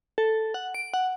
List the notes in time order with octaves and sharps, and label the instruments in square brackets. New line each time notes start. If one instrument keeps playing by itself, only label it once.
[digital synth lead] A4
F#5
D7
F#5